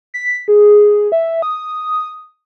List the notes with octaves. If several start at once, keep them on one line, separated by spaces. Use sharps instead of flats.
B6
G#4
E5
D#6